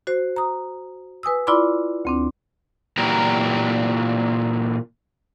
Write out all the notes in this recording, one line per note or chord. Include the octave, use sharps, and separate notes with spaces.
F#4 C5
A#5 D#6
B4 G#5 D#6 E6
E4 F4 D5 B5 C6 D6
D2 C4 D4
A#2 E3 F#3 G4 A#4 A#5